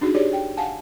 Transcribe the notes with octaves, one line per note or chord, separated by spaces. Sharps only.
D4 D#4 F#4 G#4
G4 G#4 C#5 D5
G5
F5 F#5 G#5 A5